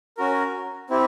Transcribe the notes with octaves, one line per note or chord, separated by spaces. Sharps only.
C#4 F#4 A#4
C4 E4 G4